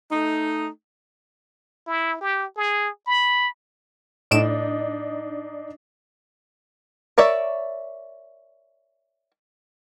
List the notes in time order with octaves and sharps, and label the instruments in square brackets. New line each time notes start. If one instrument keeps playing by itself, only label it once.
[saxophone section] A3 D#4
[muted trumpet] E4
G4
G#4
B5
[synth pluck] A2 D7 E7 [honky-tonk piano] D4 D#4
[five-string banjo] A#4 C#5 D5 E5